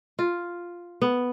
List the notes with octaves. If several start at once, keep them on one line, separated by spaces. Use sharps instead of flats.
F4
B3